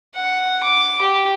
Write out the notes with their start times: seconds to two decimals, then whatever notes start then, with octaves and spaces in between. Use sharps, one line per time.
0.16 F#5
0.64 D6
1.01 G4